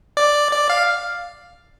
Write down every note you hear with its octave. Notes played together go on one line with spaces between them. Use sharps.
D5
D5
F5